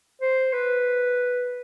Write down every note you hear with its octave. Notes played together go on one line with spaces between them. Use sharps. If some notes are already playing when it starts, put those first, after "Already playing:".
C5
B4